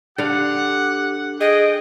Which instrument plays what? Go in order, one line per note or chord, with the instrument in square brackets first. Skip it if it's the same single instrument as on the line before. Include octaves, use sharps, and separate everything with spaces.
[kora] D3 F5 [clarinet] G4 [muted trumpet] F#5
[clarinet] G#4 [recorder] D#5 [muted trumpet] G5